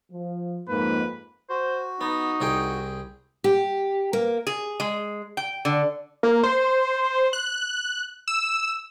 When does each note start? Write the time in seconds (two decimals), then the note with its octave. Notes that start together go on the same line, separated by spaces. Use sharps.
0.12 F3
0.69 F2 G#2 A#3 B4
1.50 F#4 C5
2.01 B3 D#4
2.41 C2 G#4 G5
3.44 G4
4.13 A#3
4.47 G#4
4.80 G#3
5.37 G5
5.65 D3
6.23 A#3
6.43 C5
7.33 F#6
8.28 E6